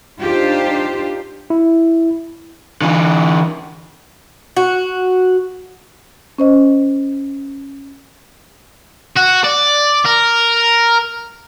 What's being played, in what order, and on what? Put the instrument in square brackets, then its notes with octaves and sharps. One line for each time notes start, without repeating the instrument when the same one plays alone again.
[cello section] D4 D#4 F4 G4 C5
[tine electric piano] E4
[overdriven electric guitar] D3 E3
[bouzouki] F#4
[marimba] C#4 C5 D#5
[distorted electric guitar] F#4
D5
A#4